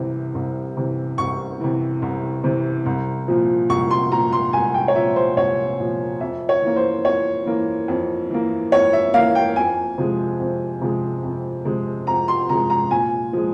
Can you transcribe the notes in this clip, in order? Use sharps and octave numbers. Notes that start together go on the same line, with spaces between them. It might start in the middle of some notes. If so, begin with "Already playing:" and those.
Already playing: C2 C3 E3
C2
C3 E3
C2 C#6
C3 E3
C2
C3 E3
C2
A#2 F3
C2 C#6
C6
A#2 F3 A#5
C6
C2 G#5
G5
C#5
A#2 F3 E5
C5
C2 C#5
A#2 F3
F2 E5
C#5
E3 A#3
C5
F2 C#5
E3 A#3
F2
E3 A#3
F2 C#5
E5
E3 A#3 F5
G5
F2 G#5
C3 F3 G#3
F2
C3 F3 G#3
F2
C3 F3 G#3
F2 A#5
C6
C3 F3 G#3 A#5
A#5
A#2 G#5
F3 G#3